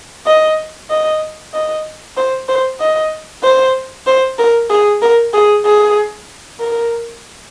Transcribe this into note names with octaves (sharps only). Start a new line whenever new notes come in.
D#5
D#5
D#5
C5
C5
D#5
C5
C5
A#4
G#4
A#4
G#4
G#4
A#4